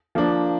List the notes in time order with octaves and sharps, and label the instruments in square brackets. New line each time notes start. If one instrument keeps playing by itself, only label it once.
[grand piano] F3 A#3 D4